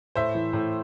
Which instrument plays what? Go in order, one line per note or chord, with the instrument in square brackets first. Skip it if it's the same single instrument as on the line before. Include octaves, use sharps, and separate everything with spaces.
[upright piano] A2 C5 E5
E3
A2